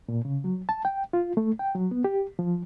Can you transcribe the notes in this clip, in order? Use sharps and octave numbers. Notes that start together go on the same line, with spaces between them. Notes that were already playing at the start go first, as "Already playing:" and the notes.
A#2
C#3
F#3
A5
G5
F4
A3
G5
F#3
B3
G4
F3